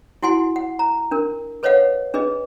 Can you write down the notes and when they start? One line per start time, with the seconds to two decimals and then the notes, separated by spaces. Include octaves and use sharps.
0.22 E4 F#4 F#5 G#5 C6
0.56 F#5
0.79 A#5
1.11 D4 A#4
1.63 A4 B4 C#5 D#5 F5 F#5
2.14 D4 G#4 B4 D#5